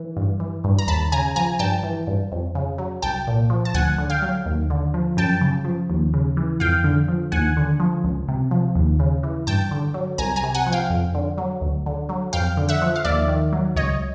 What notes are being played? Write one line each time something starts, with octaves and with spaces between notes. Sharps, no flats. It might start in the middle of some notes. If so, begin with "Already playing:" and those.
Already playing: E3
G2
E3
G2
A#5
D#2 A5 B5
C#3 G#5 A#5
F3 G#5 A#5
G2 G5 A5
E3
G2
F2
C#3
F#3
C2 G5 A5
A#2
F3
A5
D2 F#5 G#5
D3
F5 G5
F#3
D#2
D3
F3
F#2 G5 A5
C#3
F3
D#2
C#3
E3
F2 F5 G5
D3
F3
D#2 F#5 G#5
D3
F3
C#2
C3
F3
D#2
C#3
E3
G2 G5 A5
D3
F#3
C2 G#5 A#5
G#5 A#5
C3
F#5 G#5
F3
F5 G5
F2
D3
F#3
D2
D3
F#3
F2 F5 G5
D3
E5 F#5
F3
F5
D#2 D5 E5
D#3
F#3
C#2 C#5 D#5